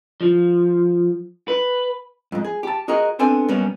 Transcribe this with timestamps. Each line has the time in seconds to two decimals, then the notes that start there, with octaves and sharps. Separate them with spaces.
0.21 F3
1.48 B4
2.32 F2 G#2
2.44 G#4
2.63 G4 A5
2.88 F#4 G#4 A#4 D#5 F#5
3.19 B3 C4 D4 A4 G#5
3.48 F#2 B2 G3 A#3 B3 C#4